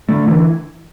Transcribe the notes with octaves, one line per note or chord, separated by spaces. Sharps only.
D3 A3
D3 E3